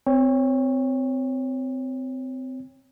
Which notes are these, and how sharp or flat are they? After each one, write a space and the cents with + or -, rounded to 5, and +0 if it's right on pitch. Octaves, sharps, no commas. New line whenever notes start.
C4 -20 C#5 +0 G5 +40